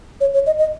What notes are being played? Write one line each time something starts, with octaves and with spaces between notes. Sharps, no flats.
C#5
C#5
D#5
D#5